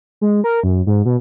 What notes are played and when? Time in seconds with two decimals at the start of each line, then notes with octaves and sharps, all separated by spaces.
0.21 G#3
0.44 A#4
0.63 F#2
0.87 G#2
1.05 B2